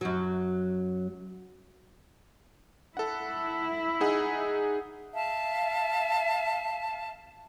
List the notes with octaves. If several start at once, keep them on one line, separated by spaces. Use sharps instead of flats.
F#2 F#3
E4 A4 F#5
D#4 G#4 F#5
E5 F5 A5